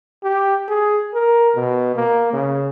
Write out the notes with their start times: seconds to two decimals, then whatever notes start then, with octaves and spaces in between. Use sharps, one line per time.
0.23 G4
0.69 G#4
1.14 A#4
1.55 B2
1.96 A#3
2.33 C#3